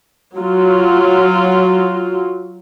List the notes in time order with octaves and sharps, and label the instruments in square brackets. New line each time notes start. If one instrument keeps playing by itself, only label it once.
[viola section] F#3 F4